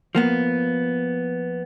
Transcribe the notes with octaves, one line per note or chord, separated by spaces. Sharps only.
F3 A#3 B3